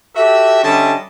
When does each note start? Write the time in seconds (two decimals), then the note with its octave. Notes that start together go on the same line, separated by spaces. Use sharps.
0.15 F#4 G4 A4 E5
0.64 D3 G3 C#4 D#5 E5 A5